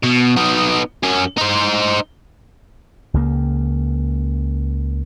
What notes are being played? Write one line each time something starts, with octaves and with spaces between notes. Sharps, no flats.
B2
B3 D#4
F#2 C#4
D#4 C5
C#2 C#3 A#3